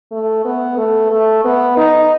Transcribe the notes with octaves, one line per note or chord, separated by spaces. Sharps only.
A3
B3
A3
A3
B3
D#4